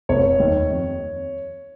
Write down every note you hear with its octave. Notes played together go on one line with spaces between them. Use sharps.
F1 C#5
D#2 D#3
F2